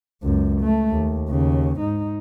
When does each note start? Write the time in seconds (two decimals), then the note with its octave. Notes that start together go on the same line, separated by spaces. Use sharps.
0.23 C#2 F#2
0.61 A3
0.91 D#2
1.30 D#2 C#3
1.80 G#2 D#4